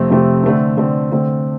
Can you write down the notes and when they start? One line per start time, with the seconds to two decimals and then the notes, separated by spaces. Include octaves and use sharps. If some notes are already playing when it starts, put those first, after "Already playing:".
Already playing: F2 C3 A3 C4
0.10 F2 C3 A3 C4
0.44 D3 A3 C4
0.77 D3 A3 C4
1.12 D3 A3 C4